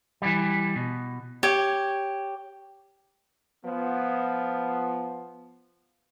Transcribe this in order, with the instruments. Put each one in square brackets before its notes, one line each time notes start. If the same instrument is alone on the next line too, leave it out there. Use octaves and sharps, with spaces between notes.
[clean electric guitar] E3 G3
B2
[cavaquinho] G4 [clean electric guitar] C#5
[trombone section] F3 B3